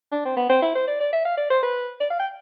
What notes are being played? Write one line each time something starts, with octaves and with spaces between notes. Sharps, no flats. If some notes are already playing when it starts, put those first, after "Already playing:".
D4
C4
B3
C4
E4
C5
D5
D5
E5
F5
D5
C5
B4
D5
F5
G5